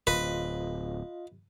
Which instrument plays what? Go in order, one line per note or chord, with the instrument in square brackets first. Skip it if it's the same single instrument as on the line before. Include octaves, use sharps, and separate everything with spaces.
[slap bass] D1 [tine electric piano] F4 D#5 F5 [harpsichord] B4